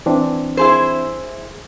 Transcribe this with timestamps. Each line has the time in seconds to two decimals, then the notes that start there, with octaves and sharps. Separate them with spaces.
0.06 E3 C4 D4
0.57 E4 G#4 C5